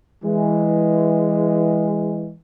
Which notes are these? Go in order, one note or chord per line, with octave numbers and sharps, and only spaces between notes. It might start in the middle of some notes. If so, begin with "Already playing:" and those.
E3 G#3